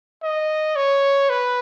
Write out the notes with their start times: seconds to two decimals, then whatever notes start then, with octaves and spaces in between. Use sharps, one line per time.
0.23 D#5
0.76 C#5
1.30 B4